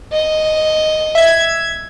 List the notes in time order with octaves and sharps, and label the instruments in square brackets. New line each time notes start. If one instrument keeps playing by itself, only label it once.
[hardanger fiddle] D#5
[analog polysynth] E5 G#6